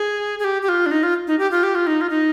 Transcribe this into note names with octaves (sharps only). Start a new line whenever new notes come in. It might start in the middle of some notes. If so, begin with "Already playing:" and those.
Already playing: G#4
G#4
G4
G4
F4
D4
D#4
F4
D#4
G4
F4
G4
F4
D#4
F4
D#4